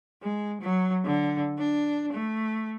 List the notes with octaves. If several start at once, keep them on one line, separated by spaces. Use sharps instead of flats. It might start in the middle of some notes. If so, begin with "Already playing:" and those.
G#3
F#3
D3
D4
A3